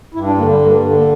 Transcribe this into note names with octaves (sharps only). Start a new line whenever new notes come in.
G2 E4
D4
D3 A#3
G3
G2 A#3
A#3
D3
A#3